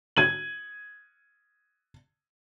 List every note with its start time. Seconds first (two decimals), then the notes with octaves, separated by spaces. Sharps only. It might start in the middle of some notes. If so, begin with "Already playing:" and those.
0.17 G#6 D#7 F#7